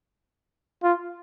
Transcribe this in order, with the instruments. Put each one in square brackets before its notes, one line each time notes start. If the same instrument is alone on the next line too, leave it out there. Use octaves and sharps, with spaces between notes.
[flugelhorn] F4